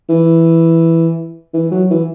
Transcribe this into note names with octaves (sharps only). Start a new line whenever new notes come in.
E3
E3
F#3
E3